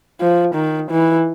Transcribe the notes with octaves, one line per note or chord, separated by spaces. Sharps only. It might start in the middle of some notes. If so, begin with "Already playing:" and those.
F3
D#3
E3